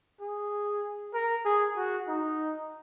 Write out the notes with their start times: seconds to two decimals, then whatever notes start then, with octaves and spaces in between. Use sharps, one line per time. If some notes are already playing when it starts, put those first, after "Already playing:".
0.21 G#4
1.14 A#4
1.45 G#4
1.76 F#4
2.08 D#4